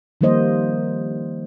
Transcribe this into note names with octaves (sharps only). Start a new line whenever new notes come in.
D#3 F3 G3 A#3 C5 D#5